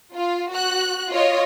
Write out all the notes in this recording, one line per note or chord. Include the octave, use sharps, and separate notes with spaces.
F4
F#4 F#6
F4 C#5 D#5